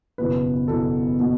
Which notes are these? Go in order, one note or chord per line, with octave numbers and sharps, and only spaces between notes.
F#1 E2 B2 B4
F#1 E2 B2 A4
B2